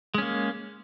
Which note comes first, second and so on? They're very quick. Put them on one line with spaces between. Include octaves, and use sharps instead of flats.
G#3 C#4 A#3